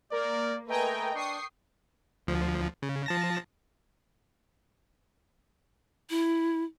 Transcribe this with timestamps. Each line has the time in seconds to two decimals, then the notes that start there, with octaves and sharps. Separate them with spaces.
0.12 A#3 A#4 D5
0.69 A3 A#4 B4 D#5 G5 G#5 A#5
1.15 D4 G5 C#6 D#6 C7
2.27 D2 F3
2.82 C#3
3.06 F3 A5 A#6
6.10 E4